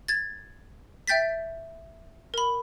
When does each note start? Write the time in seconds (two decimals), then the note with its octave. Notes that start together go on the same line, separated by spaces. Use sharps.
0.08 G#6 A6
1.07 E5 G5 G6 A6 B6
2.34 A#4 B5